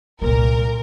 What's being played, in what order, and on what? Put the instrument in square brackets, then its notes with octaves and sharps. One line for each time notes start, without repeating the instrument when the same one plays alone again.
[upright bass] C2 G#3 [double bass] A#2 [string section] A#4